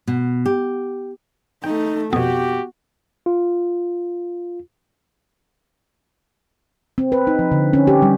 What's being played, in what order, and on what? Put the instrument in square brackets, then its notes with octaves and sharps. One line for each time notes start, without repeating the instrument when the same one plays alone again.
[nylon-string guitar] B2
G4
[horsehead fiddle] A3 D#4 [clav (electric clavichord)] G5
[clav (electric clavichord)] F2 B2 [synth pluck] B3 [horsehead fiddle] F#4 [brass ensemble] G4
[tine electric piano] F4
[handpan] C4
B4
D#4
F3
D3
C#4
G4
G3